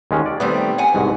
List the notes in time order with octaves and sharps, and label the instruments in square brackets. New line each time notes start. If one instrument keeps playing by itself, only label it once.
[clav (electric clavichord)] D#2 G#3 C#4
D5
[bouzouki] D#3 G3 A3 [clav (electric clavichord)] B3 C4
[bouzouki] F#5 G#5
[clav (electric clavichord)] C2 G#2 B2